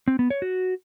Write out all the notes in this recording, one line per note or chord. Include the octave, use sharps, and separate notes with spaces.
C4
B3
C#5
F#4